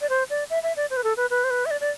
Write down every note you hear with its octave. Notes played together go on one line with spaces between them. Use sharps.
D5
C5
D5
E5
E5
D5
C5
B4
A4
B4
B4
C5
B4
E5
D5
D5